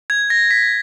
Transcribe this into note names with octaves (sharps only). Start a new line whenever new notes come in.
G#6
A#6
B6